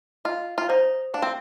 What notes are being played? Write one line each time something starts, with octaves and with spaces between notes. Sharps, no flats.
F4 D#5
F4
D#4 C5
D4 F5
C4